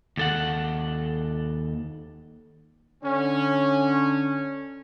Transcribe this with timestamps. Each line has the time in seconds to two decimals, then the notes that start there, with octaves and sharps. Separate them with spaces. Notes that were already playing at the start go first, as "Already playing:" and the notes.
0.17 D#2 A4 F#5
3.04 D3 C#4